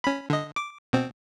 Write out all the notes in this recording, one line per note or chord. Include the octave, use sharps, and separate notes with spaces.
C#4 B5
D3 D#5
D6
B2 C4